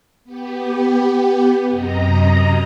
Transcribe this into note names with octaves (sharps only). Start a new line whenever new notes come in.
B3 G4
F#2 C3 D#5 A#5